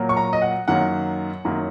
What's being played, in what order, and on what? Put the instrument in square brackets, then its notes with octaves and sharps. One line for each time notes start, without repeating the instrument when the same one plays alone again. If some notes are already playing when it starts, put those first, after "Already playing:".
Already playing: [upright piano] A#2 F#3 A#3
C#6
A#5
D#5
F#5
F#2 D#3 F#3 A#3 F#5
F#2 D#3 F#3 A#3